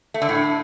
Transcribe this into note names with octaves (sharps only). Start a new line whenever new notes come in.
A3
D3
A2